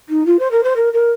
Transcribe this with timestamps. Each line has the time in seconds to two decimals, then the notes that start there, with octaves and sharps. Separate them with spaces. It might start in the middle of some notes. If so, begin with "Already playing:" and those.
0.09 D#4
0.26 F4
0.39 C5
0.51 A#4
0.63 C5
0.76 A#4
0.93 A#4